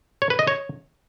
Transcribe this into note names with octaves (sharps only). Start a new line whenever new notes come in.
C#5
B4
D#5
C#5